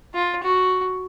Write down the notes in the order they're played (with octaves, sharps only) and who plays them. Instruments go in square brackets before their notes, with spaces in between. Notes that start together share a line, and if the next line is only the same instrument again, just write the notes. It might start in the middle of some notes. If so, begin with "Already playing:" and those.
[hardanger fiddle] F4
F#4